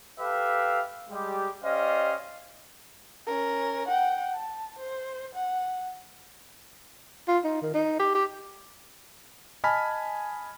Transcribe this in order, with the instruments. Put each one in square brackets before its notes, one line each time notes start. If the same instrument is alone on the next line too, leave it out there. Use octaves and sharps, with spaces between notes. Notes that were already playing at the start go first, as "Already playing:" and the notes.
[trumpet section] G4 A4 B4 E5 F5
G3 G#3 G4
C#4 G4 C5 D5 D#5 F5
[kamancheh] C#4 A#4
F#5 G5
A5
C5
F#5
[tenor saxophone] F4
D#4
D#3
D#4
G4
G4
[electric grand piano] D#5 G#5 A5 B5 F6 B6